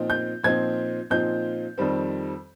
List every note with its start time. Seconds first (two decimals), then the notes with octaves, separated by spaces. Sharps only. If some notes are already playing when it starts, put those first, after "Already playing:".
Already playing: A#2 F3 C4 D#4
0.10 G6
0.43 A#2 F3 C4 D#4 G#6
1.10 A#2 F3 C4 D#4 G6
1.78 F2 D#3 G3 C4